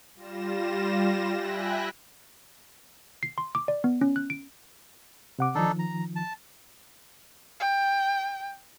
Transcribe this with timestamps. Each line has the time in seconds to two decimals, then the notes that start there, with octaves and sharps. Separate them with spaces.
0.15 G3 F4 A#6 E7
1.32 E5 G5 G#5 B5 F#6 A#6
3.23 C7
3.38 C6
3.55 D6
3.68 D5
3.84 B3
4.01 C#4
4.16 F#6
4.30 D7
5.39 C3 F#5 D6
5.55 D#3 F3 D4 D#4 A4
5.79 A#5
6.16 A5
7.60 G5